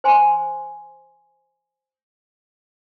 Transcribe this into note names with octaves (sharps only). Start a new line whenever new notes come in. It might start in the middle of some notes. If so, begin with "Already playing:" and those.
C5 G#5 C6